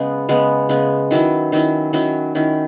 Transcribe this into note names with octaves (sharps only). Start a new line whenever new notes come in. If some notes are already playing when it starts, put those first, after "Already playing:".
Already playing: C#3 G#3 B3
C#3 G#3 B3
C#3 G#3 B3
D#3 F#3 C#4 E4
D#3 F#3 C#4 E4
D#3 F#3 C#4 E4
D#3 F#3 C#4 E4